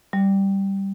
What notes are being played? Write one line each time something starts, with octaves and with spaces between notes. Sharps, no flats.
G3